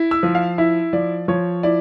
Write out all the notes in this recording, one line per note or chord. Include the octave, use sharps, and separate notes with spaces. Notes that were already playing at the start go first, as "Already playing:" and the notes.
Already playing: E4
E6
F3
F5
E4 E5
F3 D5
F3 C#5
E4 D5